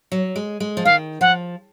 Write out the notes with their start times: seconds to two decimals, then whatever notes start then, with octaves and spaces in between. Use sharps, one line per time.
0.12 F#3
0.36 G#3
0.60 G#3
0.77 F3
0.85 D#3 F5
1.21 F3 F#5